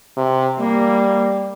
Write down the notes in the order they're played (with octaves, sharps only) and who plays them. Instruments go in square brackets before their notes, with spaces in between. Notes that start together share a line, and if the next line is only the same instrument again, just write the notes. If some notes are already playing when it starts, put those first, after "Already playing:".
[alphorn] C3
[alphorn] G3 [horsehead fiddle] A#3